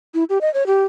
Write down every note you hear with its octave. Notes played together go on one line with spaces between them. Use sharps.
E4
G4
D#5
C#5
G4